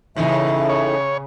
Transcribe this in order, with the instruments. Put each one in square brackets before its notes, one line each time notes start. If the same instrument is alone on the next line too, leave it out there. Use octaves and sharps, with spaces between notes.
[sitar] A2 E3 D#4 [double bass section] C#3 [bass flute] E5
[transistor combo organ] C#5